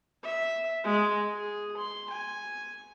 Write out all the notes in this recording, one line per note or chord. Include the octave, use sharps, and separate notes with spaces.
E5
G#3
G#4
C6
G#5